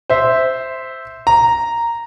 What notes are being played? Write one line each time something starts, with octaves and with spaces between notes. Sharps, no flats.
C5 E5
A#5